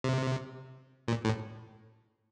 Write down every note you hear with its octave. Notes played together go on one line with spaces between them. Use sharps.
C3
A#2
A2